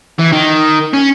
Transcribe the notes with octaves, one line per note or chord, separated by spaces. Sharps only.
E3
D#3
C#4